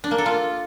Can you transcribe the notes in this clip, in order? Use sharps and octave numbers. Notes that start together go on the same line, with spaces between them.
D4
A#3
A4
F4